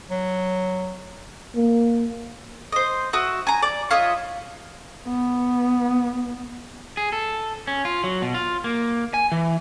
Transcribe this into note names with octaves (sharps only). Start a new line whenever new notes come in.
F#3
A#3
C5 D#5
F#4 E5 D#6
G#5 A#5
D5
F4 C#5 D#5 E5
B3
G#4
A4
C#4
F4
F#3
B2
F4
A#3
G#5
E3